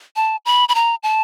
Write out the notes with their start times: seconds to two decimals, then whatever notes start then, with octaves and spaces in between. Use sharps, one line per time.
0.16 A5
0.45 B5
0.69 B5
0.75 A#5
1.03 A5